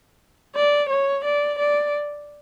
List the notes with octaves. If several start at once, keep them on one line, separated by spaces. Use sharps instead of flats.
D5
C#5
D5
D5